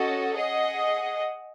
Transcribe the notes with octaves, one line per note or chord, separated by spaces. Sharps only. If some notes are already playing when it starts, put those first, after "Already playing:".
Already playing: C#4 F#4 A4 D#5
G#4 D#5 F#5